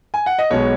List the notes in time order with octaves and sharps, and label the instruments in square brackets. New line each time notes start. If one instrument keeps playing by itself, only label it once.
[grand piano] G#5
F#5
D#5
B1 B2 G#3 B3 C#5